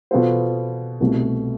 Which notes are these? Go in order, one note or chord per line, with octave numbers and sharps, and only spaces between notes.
B2 B3 F4 A4 C5
C2 B2 A3